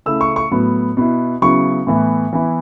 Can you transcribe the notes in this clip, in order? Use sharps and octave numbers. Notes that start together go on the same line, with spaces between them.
C#3 A3 E4 E6
C#6
C#6
A2 F#3 B3
B2 B3 E4
C#3 F#3 B3 E4 C#6
A2 E3 B3 E4
E3 B3 E4